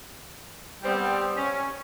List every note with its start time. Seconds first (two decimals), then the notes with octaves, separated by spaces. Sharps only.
0.83 G3 B3 C4
1.36 C#4